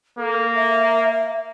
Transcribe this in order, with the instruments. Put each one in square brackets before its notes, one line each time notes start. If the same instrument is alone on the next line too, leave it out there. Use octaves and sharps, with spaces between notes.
[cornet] A#3 [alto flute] A4
[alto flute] E5